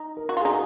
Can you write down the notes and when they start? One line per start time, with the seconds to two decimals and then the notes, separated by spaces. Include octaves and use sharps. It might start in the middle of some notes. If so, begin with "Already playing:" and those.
Already playing: D#4
0.17 A#4
0.29 F#4
0.37 F4
0.41 G#4
0.45 D#4 F#4